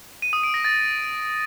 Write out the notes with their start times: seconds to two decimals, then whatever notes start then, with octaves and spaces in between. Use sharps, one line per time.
0.22 D#7
0.33 D#6
0.43 D7
0.54 A#6
0.65 A6